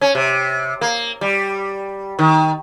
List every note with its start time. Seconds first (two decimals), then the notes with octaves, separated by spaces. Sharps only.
0.01 C#4
0.15 C3
0.81 A#3
1.21 G3
2.19 D#3